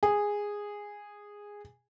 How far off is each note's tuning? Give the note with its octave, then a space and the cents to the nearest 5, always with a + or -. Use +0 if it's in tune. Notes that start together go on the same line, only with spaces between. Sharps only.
G#4 -10